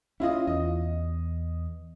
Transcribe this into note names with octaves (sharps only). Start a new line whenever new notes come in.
C#4 E4 F4 D#5
E2 D#5